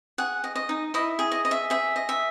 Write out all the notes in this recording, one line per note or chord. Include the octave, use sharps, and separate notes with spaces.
G#4 F#5
D#5
D#5
D#4
E4 D#5
G#4
D#5
D#5
E5
G#4 E5
D#5
E5